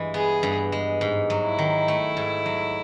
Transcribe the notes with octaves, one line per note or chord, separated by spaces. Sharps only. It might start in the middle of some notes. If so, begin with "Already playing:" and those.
Already playing: G2 E3 G#3
B3 G#4
G2
G#3
G#2
F#3
E4
D#3
A3
G#2
F#3